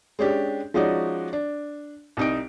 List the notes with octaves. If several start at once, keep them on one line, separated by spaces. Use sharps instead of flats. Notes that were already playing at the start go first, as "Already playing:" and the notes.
G#3 C#4 D4 G4
F3 G#3 C#4 D#4 F#4 D5
D4
C2 D#4 D7